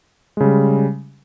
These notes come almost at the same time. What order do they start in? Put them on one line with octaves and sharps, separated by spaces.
G#3 C#3 G3